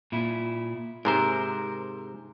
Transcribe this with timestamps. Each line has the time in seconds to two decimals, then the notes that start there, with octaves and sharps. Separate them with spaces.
0.12 A#2 E4
1.05 G#2 C3 A#4 C5